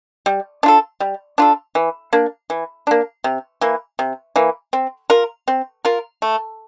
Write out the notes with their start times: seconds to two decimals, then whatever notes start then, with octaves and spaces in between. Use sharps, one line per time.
0.26 G3
0.63 D4 F4 A4
1.00 G3
1.38 D4 F4 A4
1.75 E3
2.13 A#3 D4
2.50 E3
2.87 A#3 D4
3.24 C3
3.61 E3 A#3
3.99 C3
4.36 E3 A#3
4.73 C4
5.10 F4 A#4
5.48 C4
5.85 F4 A#4
6.22 A3